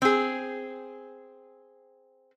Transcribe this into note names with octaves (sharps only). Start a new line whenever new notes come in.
C4 G#4